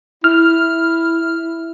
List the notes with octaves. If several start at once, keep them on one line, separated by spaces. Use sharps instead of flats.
E4 F6